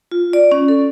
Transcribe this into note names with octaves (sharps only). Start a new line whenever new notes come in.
F4
D5
C#4
A4